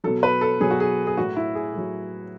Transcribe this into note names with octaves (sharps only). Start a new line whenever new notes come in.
B2 F#3 A4
B4
A4
B2 F#3 G#4
F#4
G#4
G#4
A2 F#3 F#4
E4
G#4
A2 F#3